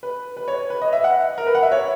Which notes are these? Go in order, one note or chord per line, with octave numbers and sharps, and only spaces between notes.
B4
B4
C#5
B4
D#5
E5
F#5
A#4
B4
F#5
E5
C#5